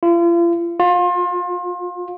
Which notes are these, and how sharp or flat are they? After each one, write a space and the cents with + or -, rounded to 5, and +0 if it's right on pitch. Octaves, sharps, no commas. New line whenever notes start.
F4 -40
F4 +30